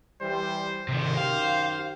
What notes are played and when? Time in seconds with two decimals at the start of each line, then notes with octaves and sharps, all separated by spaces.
0.22 E3 G3 C5
0.88 A#1 C3 D#3 C5
1.17 F#2 D#3 G4 F5